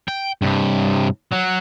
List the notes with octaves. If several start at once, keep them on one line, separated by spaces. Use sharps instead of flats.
G5
G2 C3
F#3